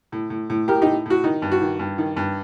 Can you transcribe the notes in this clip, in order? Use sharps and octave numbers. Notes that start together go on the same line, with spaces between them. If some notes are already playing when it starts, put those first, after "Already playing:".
A2
A2
A2
A2 G4 A#4
A2 D#4 G4
A2 F#4
D#3 D#4
G2
F#4
D#3
G2
D#3
G2